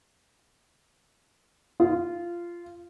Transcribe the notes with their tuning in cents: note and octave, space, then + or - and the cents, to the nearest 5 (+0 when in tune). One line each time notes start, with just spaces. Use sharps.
F4 -15